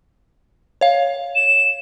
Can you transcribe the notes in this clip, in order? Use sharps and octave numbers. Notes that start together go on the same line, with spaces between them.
C#5 F5
E7